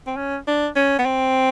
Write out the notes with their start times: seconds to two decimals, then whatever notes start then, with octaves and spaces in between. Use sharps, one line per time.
0.06 C4
0.16 C#4
0.47 D4
0.76 C#4
0.99 B3
1.05 C4